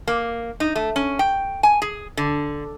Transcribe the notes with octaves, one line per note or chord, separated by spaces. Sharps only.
A#3
D#4
A3
C#4
G5
G#5
G#4
D3